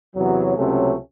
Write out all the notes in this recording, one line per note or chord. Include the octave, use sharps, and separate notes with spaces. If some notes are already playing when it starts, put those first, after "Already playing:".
E2 C3 F#3
C#2 C3 F#3 A3 C#4